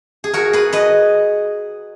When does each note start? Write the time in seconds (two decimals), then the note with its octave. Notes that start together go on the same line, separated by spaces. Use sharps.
0.24 G#4
0.34 F#4 A#4
0.53 G#4 B4
0.73 B4 D#5